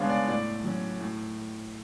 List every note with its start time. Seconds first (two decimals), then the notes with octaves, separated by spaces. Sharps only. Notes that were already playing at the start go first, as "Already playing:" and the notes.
Already playing: C#3 G#3 B3 D4 C#5 F5
0.09 D5
0.28 A2 D5
0.64 F#3 C#4
1.00 A2